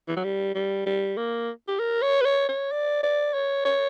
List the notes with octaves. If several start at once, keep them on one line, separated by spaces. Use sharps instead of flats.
E3
F#3
G3
G3
G3
A#3
G4
A#4
C#5
B4
C#5
C#5
D5
D5
C#5
C#5